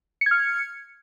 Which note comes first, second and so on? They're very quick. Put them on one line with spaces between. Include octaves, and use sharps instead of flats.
C#7 G#6 F6